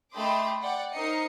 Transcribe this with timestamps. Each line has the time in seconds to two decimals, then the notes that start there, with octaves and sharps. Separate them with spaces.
0.14 A3 D#5 G5 B5 C6 D6
0.61 D5 F#5 G5
0.92 D#4 A#4 C5 D#5 C7 C#7